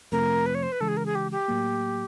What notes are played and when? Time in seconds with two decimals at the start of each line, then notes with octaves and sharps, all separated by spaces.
0.12 F2 C3 F3 A3 C4 A#4
0.46 B4
0.55 C#5
0.63 C5
0.72 B4
0.81 C#3 E3 G#3 A4
0.88 G#4
0.97 A#4
1.06 G#4
1.15 G4
1.32 G4
1.48 A2 F#3 A#3